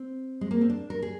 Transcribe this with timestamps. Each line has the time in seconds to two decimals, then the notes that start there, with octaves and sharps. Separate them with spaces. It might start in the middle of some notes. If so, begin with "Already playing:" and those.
Already playing: C4
0.41 G#3
0.51 A#3
0.61 C4
0.70 D4
0.90 A#4
1.02 G#4